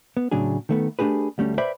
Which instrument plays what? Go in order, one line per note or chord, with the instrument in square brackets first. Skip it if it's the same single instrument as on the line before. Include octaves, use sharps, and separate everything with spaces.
[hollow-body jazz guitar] B3
A2 C#3 F#3 D4 G#4
D#3 A3 B3
A3 D4 G4 G#4 B4
D2 G3 A3 C#4
B4 C5 D5 E5 G5 B5